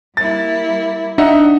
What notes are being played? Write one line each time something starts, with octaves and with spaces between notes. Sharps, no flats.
G3 A#3 E4 A6
D4 D#4 E5 F#5